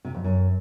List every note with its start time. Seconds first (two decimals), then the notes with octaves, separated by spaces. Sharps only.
0.05 C3
0.14 F2
0.24 F#2